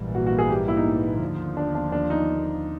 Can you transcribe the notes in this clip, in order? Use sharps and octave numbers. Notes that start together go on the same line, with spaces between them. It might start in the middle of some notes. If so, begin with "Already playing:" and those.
Already playing: A#1 G#2 E3 G3 A#3
F#4
F#4
G#4
G4
E4
D#4
D#2 D3 F3
D4
D4
D4
D#4